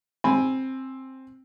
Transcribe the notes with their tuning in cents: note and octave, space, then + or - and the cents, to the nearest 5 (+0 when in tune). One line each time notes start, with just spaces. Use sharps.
C4 +10 G#5 +0 B5 +0